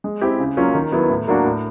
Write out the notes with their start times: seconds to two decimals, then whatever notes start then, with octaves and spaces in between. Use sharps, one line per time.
0.04 G#3
0.21 C4 E4 G4
0.40 C#3
0.57 F#3 A#3 C#4 F4
0.74 D#3
0.92 F#3 B3 E4
1.10 A2
1.28 F#3 A#3 D4 F#4
1.45 A2